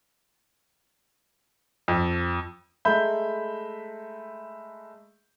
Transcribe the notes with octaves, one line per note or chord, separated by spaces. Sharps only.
F2
G#3 A3 E5 A#5 B5 G6